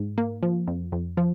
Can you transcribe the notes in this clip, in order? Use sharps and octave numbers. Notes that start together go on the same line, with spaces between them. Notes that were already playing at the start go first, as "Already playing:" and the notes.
Already playing: G#2
A#3
F3
F2
F2
F3